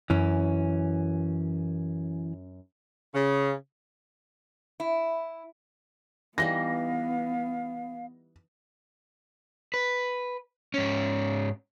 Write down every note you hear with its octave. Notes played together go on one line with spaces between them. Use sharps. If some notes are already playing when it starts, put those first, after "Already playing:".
F#2 E3 C#4
C#3
E4
E3 G3 B3 D#4 F5 A#6
B4
G#2 C#4